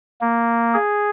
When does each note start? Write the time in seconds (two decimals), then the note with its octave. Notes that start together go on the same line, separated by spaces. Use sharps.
0.21 A#3
0.74 G#4